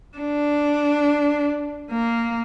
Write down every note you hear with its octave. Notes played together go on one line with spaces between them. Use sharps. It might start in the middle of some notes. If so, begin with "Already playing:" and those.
D4
A#3